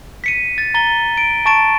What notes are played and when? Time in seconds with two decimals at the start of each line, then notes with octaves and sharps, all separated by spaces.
0.24 B6 C#7 D#7
0.58 A6
0.74 A#5 A6 G7
1.18 D7
1.46 A5 C#6 A6 D7 E7